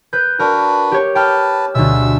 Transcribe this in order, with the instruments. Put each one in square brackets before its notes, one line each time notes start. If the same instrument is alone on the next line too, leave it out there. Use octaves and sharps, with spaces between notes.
[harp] B4 G6
[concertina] D4 F#4 B4 [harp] A#4
[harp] G4 C#5
[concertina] B4 A5 [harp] G5 F6
[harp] D2 B2 [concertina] G#3 E5 E6